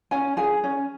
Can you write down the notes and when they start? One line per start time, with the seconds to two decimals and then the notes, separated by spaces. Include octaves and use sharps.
0.11 C#4 G#5
0.37 G#4 G#5
0.64 C#4